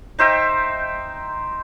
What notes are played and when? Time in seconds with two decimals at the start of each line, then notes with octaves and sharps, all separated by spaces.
0.19 D#4 C5 E5 G5